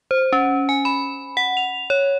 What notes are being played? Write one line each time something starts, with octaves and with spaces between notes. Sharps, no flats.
C5
C#4
G#5
B5
F#5
F7
C#5